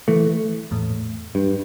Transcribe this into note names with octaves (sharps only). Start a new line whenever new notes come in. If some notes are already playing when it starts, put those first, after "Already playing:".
E3 A3
E2 A2
G2